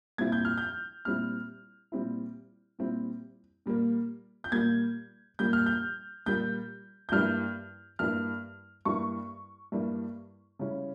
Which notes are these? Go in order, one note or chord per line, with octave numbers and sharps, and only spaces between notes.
A#2 G3 C4 E4 G#6
G6
F6
G6
A#2 G3 C4 E4 F6
A#2 G3 C4 E4
A#2 G3 C4 E4
A#2 G3 A#3
G6
A#2 G3 A#3 G#6
A#2 G3 A#3 G6
F6
G6
A#2 G3 A#3 G6
G6
G2 G3 A#3 E4 F6
G2 G3 A#3 E4 F6
G2 G3 A#3 E4 C#6
G2 G3 A#3 E4
C#3 G3 C#4 E4